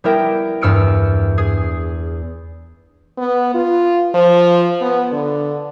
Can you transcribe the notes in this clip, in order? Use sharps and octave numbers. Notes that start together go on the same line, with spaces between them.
G3 B3 E4 A#4 E5 G5
E2 G2 E6 F6 C#7 D7
G#4
B3
F4
F3
B3
D3